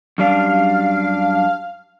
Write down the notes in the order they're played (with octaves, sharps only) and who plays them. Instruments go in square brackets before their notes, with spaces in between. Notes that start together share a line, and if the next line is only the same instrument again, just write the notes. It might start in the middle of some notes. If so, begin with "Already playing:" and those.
[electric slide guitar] F#2 G3 D4 [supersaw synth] F5